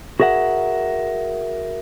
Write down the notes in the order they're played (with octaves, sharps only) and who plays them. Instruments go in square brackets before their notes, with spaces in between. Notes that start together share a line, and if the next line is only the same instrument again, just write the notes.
[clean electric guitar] F#4 G#4 A#4 E5 F#5